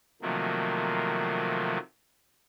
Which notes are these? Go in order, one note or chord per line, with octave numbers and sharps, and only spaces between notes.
C3 D#3 F3 F#3 A3 A#3